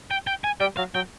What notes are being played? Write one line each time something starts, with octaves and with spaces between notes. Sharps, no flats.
G5
G5
G#5
G3 G5
F#3 F5
F#3 G5